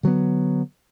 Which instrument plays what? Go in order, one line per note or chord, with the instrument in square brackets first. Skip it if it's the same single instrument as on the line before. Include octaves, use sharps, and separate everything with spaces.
[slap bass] D3 F#3 B3